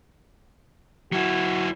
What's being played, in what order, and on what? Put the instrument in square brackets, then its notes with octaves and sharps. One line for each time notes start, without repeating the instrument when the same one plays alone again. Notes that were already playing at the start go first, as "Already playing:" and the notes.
[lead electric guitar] F#3 E4 [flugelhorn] F#4